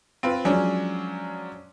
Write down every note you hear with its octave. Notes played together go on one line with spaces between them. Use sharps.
C4 F4 B4
F3 F#3 G#3 C#4 D4